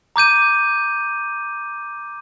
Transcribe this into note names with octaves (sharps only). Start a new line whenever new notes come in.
A#5 D6 G6 D#7